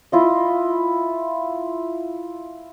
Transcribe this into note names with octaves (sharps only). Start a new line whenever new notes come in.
E4 F4 D#5